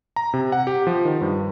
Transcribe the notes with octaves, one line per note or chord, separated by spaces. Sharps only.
A#5
C3
F#5
G4
F3
D#3
G2